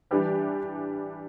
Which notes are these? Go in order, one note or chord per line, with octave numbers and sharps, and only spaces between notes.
E3 G3 D4 G4 B4